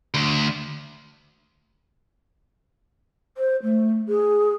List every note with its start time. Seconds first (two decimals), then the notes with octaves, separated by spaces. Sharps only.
0.14 D2
3.37 C5
3.63 A3
4.08 G#4